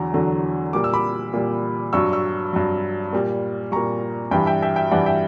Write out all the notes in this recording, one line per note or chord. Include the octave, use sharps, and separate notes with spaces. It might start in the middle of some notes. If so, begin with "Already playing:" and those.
Already playing: E2 D3 F#3 A#5
E2 D3 F#3
A#2 G3 D6
E6
B5 D6
A#2 G3
G2 F#3 C#6 E6
C#6 E6
G2 F#3
A#2 G3
A#2 G3 A#5 C#6
G2 E3 G3 G5 B5
E5 G5
E5 G5
E5 G5
G2 E3 G3 D5 F#5
E5 G5